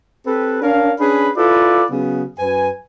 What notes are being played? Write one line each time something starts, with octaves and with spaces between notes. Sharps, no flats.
C4 G4 A4 B4
C#4 D4 A#4 F5
C#4 D4 G#4 B4 B5
E4 F4 A4 B4 D5
C#3 F#3 B3
F#2 B4 G#5